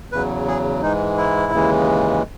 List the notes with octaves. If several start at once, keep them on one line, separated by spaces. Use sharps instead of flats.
E2 C#3 F#3 B4
G#4
G#2 E3 G#3 D#4
E4
D#2 C#3 E3 G#3